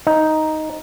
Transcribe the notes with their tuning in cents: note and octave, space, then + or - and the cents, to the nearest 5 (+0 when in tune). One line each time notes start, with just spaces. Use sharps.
D#4 +5